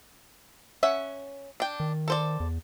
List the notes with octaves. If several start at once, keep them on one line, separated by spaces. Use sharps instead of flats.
C#4 E5 F#5
D4 G5
D#3
A4 C5 D5
E2